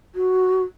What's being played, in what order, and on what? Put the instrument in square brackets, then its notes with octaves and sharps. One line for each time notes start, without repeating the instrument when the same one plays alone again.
[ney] F#4